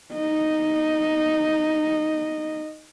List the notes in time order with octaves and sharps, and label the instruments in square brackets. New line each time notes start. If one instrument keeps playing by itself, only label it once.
[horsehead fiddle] D#4 D#5